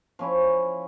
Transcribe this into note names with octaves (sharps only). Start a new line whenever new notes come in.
F3 C#4 E4